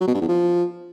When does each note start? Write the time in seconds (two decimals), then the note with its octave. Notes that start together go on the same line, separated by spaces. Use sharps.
0.01 F#3
0.08 B2
0.15 G2
0.21 E2
0.28 F3